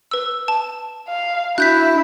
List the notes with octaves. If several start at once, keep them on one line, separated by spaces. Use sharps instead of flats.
B4 E6
A5
F5
D4 E4 F#4 F#6 G6 B6